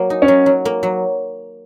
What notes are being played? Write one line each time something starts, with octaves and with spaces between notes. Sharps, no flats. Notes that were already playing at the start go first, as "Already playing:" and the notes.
Already playing: F#3 A#3
D#4
C#4
F#3
F#3
A#3
F#3